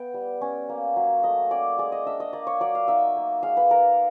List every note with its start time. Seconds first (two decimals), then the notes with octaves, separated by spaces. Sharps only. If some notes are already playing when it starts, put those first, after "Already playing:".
Already playing: B3 G5
0.14 G3
0.41 C#4
0.69 A#3
0.96 F#3
1.23 A3 D#5
1.51 C#4 D5
1.79 G#3 D5
1.92 D#5
2.06 D4 E5
2.20 D#5
2.33 A#3 D5
2.47 C#5
2.60 F#3 D5
2.75 F5
2.88 D#4 E5
3.16 A#3
3.43 G#3 F5
3.57 B4
3.71 D#4 A#4